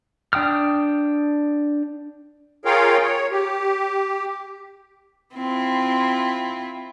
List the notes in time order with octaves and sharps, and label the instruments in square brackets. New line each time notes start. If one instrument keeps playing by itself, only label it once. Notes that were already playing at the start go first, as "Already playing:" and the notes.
[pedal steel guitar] D4 G5 D#6 F6
[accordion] F4 G#4 A#4 C#5 F5 G5
C#5
G4
[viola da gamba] C4 E4 F4